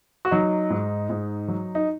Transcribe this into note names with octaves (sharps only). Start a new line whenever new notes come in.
F#4
F#3 D#4
G#2
G#2
F#3
D#4